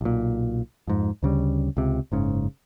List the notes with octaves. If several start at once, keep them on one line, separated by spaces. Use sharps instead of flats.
B1 A#2
F2 G#2
D2 C#3 G3
C#2 C3
F#1 G#2 C#3